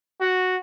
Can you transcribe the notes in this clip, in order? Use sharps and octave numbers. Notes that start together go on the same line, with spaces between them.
F#4